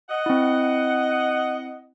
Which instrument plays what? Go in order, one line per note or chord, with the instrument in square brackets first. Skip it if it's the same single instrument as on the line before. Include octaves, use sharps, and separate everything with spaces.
[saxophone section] D#5 F#5
[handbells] C4 E4